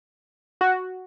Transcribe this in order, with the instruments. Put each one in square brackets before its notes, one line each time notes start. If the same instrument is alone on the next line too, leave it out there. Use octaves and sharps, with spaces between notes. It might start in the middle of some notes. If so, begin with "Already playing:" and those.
[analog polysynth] F#4